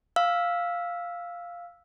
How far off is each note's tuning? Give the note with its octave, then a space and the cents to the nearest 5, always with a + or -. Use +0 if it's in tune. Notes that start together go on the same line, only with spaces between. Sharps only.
F5 +0 E6 -5